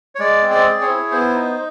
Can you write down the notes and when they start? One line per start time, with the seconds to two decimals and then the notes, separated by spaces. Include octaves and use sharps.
0.15 C#5
0.19 G#3 D5
0.43 C4
0.50 D5
0.66 G#4
0.81 C#5
0.89 E4
1.11 B3 C5
1.34 D#4